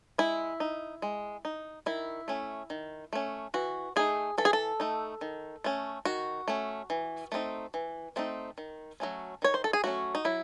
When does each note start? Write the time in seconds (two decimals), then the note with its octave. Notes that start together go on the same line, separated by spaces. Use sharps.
0.18 G#3 E4
0.60 D#4
1.02 G#3
1.45 D#4
1.86 D#3 E4
2.28 A3 C#4
2.70 D#3
3.13 A3 C#4
3.54 E3 F#4
3.96 A3 D#4 G#4
4.38 E3 A4
4.45 G#4
4.53 A4
4.80 A3 D#4
5.21 D#3
5.64 A3 C#4
6.05 D#3 F#4
6.48 A3 C#4
6.90 E3
7.32 A3 C4 D#4
7.74 E3
8.16 A3 C4 D#4
8.58 D#3
9.00 F#3 A3 C#4
9.42 D#3 C#5
9.54 C5
9.64 A4
9.73 G#4
9.84 F#3 A3 C#4 F#4
10.15 D#4
10.25 F#3 E4